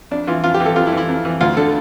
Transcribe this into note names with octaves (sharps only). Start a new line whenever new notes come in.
F2 D4
E3 F4
F2 F4
G4
E3
A4
F2 F4
E4
E3
E4
F2
E3
D2 F4
D3 A4